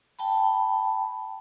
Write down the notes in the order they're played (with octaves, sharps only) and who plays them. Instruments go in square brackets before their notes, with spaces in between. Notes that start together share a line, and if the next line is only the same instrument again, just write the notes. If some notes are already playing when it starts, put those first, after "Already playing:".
[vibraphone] G5 A5 B5